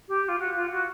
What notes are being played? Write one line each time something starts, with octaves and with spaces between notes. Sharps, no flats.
G4
F4
F#4
F4
F#4